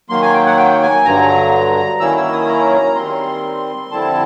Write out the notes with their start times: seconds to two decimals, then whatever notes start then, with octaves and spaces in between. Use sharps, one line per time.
0.09 D#3 F#3 A#3 C6
0.22 G#5
0.33 G5
0.46 F#5
0.57 G5
0.82 G#5
1.05 G2 D3 F#3 A#5
2.00 D#3 F#3 A#3 C#4 E4 E6
2.17 E6
2.33 D#6
2.48 A#5
2.96 D#3 G3 C4 C6
3.91 F2 D3 G3 C4 E4 A5